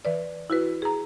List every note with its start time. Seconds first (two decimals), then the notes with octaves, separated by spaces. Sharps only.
0.05 E3 B4 D5
0.50 E4 F#4 B4
0.82 G#4 A#5